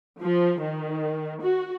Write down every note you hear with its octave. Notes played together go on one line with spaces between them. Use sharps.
F3
D#3
F#4